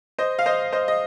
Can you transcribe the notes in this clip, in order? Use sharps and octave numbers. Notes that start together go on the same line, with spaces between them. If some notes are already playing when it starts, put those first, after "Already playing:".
C5 D#5
F5
C5 D#5
C5 D#5
D#5